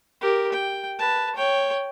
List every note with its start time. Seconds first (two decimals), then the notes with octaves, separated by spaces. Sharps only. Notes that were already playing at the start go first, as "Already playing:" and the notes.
0.22 G4 A#4
0.52 G5
0.99 B4 A5
1.36 C#5 G5